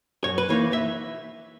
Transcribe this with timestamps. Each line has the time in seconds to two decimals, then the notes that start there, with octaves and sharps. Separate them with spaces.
0.24 F#2 C#5
0.38 B4
0.49 E3 A#3 D#4 C#5
0.73 E5